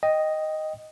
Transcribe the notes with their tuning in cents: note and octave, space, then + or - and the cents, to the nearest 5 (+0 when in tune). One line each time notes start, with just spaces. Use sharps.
D#5 +0 G5 +0